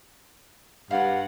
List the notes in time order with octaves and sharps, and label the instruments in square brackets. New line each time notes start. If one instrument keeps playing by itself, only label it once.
[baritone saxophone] G2 [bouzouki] F5 [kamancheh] F#5